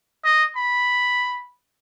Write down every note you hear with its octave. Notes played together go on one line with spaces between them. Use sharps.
D#5
B5